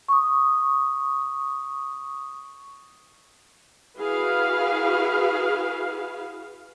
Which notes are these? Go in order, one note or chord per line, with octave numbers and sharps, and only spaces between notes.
C#6 D#6
E4 F#4 G#4 B4 F5